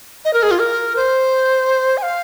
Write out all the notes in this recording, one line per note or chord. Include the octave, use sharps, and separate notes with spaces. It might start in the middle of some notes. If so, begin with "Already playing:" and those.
D#5
A#4
G#4
F4
A#4
C5
G#5
F5